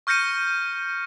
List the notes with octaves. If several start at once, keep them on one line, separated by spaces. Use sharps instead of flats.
C#6 F6 G6 A#6 C#7 D#7